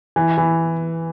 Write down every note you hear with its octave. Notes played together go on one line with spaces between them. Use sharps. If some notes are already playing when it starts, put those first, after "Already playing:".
E3
E3